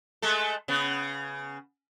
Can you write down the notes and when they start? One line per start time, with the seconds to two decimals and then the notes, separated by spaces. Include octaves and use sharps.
0.22 G#3 A3 A4
0.68 C#3 B3